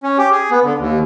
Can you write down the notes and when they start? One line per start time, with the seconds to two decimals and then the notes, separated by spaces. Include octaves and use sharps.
0.03 C#4
0.18 G4
0.32 G#4
0.51 B3
0.64 D3
0.79 D#2